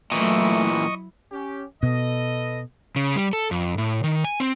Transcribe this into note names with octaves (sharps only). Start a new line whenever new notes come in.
A#2 E3 F#3 A3 E4 D#5 C#6
C#4 G4
B2 A4 B4 D#5
C#3
G3
A4
F2
A2
D#3
G#5
C4